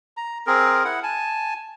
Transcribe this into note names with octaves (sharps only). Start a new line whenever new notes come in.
A#5
C4 G#4 A#4
E4 F#5
G#5 A5